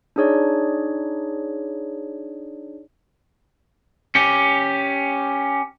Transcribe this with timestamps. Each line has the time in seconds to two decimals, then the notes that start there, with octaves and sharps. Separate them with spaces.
0.16 D4 D#4 G#4 C#5 D5
4.15 C#4 G4